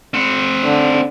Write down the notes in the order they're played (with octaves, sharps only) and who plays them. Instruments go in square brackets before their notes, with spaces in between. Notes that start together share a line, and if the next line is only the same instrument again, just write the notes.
[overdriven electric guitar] C4 F#5
[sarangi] D3